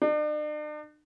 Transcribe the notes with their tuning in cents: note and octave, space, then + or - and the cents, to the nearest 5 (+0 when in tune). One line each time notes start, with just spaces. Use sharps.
D4 +45